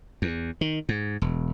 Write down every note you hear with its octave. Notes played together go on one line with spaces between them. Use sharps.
E2
D#3
G#2
E1